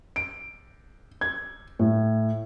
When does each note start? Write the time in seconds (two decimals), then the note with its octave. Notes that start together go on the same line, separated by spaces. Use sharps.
0.16 D7
1.21 G#6
1.79 A2